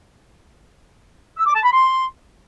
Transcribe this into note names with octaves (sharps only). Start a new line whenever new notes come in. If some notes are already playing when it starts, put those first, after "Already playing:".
E6
D6
A5
B5
C6